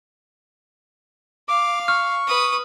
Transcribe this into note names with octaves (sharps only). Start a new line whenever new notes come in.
F5 D6
C#6 F6
B4 D#6